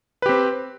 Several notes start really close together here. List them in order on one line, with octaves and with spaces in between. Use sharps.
B4 G4 C4